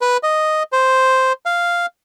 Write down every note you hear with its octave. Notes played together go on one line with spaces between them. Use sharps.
B4
D#5
C5
F5